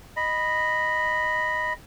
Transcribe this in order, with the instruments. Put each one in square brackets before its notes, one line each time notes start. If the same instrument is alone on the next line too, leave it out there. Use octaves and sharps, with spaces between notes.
[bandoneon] D#5 B5